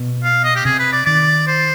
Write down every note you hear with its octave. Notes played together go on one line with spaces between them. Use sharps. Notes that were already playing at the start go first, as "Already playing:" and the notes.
Already playing: B2
F5
D#5
G4
C3 G#4
B4
D5
D#3 D5
C5